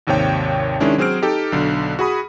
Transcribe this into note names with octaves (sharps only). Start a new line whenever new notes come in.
G#1 D#2 C3 C#5 G5
D#3 G#3 C#4 D4 E4
F#3 C4 G#4 C5 F6 D7
D#4 G4 A4
B1 D3 F#3
F#4 G#4 B5 D#6